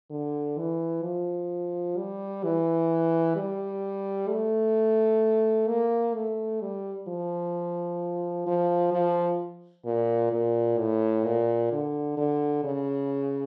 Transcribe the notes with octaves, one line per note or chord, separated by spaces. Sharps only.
D3
E3
F3
G3
E3
G3
A3
A#3
A3
G3
F3
F3
F3
A#2
A#2
A2
A#2
D3
D3
C#3